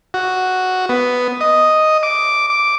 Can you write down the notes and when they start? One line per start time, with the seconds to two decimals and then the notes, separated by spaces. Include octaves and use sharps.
0.14 F#4
0.89 B3
1.41 D#5
2.03 D6
2.50 D6